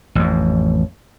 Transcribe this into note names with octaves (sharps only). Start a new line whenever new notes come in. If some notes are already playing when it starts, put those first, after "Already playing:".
A1 F2